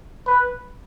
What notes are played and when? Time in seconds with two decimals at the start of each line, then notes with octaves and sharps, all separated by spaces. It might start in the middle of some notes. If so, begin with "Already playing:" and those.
0.27 B4